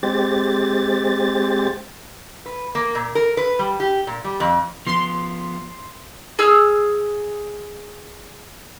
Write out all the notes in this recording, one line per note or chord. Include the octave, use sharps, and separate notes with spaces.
G#3 C4 G4 A6
B4
A#3
A#2
A#4
B4
G3
G4
A#2
G3
F2
F3 B3 C6
G#4 E6 F6